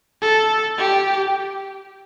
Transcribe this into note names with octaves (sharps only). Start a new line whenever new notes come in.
A4
G4